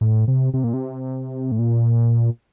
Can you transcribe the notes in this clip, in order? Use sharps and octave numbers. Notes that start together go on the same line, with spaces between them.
A2
C3
C3
A#2
C3
A2
A#2